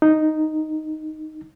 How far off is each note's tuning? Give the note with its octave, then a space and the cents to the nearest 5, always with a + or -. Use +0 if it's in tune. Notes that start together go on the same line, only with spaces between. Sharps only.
D#4 -5